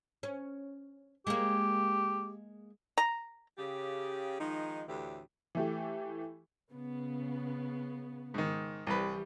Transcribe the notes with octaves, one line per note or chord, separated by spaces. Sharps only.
C#4
G#3 A#3 G4
A#5
C#3 G4
D#3 F3 G#3 D#4
D2 A2 D3 E3 G4
E3 A3 G4
C#3 B3
G#2 D#3
C2 E3 G3 B4